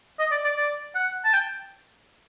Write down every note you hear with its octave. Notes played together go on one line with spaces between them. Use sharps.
D#5
D5
D5
D5
F#5
A5
G5